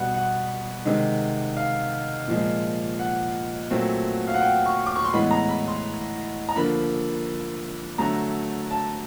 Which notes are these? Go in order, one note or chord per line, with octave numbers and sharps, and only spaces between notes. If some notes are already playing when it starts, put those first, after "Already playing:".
Already playing: B2 G3 B3 F#5
F#5
C3 D#3 G#3
F5
A#2 F3 G#3
F#5
A#2 F#3 A3 C4
F5
F#5
G5
C#6
D6
C#6
C6
A2 E3 G#3 B3 B5
A#5
B5
C6
A#5
D3 F3 A#3 B5
D3 F#3 A3 A#5
A5